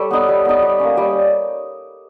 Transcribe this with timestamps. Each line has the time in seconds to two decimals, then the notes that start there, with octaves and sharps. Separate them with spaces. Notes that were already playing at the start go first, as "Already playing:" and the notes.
Already playing: G3 A4 C#5
0.10 B3 D#4
0.28 G3
0.45 B3 D#4
0.62 G3
0.79 A#3 C#4
0.97 G3